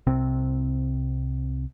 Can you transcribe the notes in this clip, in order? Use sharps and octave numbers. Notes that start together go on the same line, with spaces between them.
C2 C3 C4